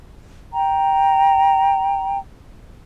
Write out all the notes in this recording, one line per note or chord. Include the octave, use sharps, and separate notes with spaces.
G5 A#5